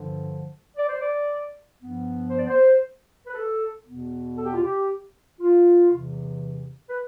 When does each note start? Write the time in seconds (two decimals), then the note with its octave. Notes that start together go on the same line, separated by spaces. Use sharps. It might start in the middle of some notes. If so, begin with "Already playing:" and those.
Already playing: G2 D3 F3
0.77 D5
0.88 C5
1.00 D5
1.79 G2 F3 B3
2.30 C5
2.39 D5
2.47 C5
3.27 B4
3.34 A4
3.85 E2 B2 B3
4.38 A4
4.45 G4
4.53 F4
4.61 G4
5.40 F4
5.92 E2 C3 E3
6.89 B4